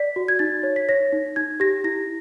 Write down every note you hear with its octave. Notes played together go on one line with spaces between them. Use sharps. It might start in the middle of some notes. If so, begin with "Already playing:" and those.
Already playing: D5 B6
F#4
G#6
D#4 A6
C#5
B6
C#5 A#6
D#4
D#4 G#6
G4 A#6
E4 A#6